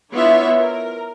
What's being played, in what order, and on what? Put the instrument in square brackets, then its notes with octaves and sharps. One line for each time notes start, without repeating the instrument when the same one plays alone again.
[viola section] B3 D4 E4 F4 C#5 E5
A#4